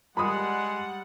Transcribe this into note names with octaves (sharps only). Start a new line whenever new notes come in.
G3 G#3 F#5 B5 D#6